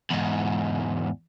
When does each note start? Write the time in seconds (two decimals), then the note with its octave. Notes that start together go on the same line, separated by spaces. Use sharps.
0.10 E2 G#2